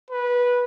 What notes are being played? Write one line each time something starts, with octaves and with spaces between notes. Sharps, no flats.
B4